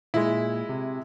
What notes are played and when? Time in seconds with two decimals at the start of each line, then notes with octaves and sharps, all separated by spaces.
0.14 A#2 G#3 E4
0.69 C3